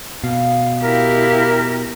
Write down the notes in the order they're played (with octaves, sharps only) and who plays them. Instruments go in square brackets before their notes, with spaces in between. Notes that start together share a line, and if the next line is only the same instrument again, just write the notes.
[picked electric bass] B2 [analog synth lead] F5
[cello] E4 G4 [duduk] A#4